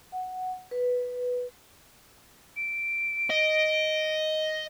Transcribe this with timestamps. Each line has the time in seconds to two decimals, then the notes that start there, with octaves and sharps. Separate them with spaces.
0.12 F#5
0.71 B4
2.56 D7
3.30 D#5